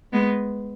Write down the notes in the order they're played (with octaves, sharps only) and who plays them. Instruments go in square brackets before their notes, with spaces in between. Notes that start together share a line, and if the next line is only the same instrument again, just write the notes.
[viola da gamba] G#3 B3